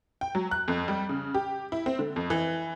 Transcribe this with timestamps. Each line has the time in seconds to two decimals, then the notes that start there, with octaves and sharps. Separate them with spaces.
0.21 G5
0.35 F#3
0.51 F#6
0.68 F2
0.88 G3
1.09 C#3
1.34 G4
1.72 E4
1.86 C4
1.99 D3
2.16 F2
2.30 E3